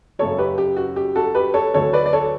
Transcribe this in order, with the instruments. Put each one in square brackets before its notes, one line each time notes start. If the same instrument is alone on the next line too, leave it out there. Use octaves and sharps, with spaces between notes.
[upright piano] F#2 C#3 F#3 A4 C#5
G4 B4
G4
F#4
G4
F#4 A4
G4 B4
A4 C#5
D2 D3 F#3 A4 C#5
B4 D5
D5
A4 C#5